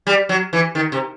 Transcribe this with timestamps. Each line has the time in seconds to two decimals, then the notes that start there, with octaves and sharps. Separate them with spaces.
0.07 G3
0.29 F#3
0.53 E3
0.75 D#3
0.92 C3